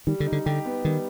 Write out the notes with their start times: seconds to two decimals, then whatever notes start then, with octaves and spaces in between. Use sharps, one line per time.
0.07 D#3 G3
0.20 D3
0.26 D#4
0.32 D3
0.46 D3 G4
0.66 B3
0.85 D#3 G3